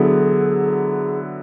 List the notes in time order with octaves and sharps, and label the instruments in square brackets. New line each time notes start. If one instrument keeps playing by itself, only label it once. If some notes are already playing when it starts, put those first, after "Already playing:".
Already playing: [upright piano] D3 F#3 B3 E4 [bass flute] G#4